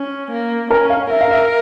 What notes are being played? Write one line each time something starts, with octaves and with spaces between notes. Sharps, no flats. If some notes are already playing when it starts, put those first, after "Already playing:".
Already playing: C#4
A#3
C#4 A#4
F5
A#4 E5
F5
E5